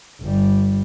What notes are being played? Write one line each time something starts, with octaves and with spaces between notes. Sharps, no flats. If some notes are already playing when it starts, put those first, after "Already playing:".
G1 G3